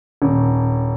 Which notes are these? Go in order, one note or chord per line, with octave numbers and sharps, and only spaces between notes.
D#1